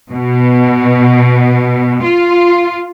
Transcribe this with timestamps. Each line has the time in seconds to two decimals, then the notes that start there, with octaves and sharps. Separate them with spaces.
0.12 B2
2.03 F4